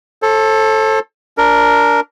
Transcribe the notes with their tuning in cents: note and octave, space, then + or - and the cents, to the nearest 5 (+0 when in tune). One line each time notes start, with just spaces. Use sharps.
A4 +0 C5 +45
D4 -15 A#4 +0